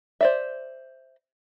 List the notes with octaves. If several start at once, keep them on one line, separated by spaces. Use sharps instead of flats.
C5 D5 E5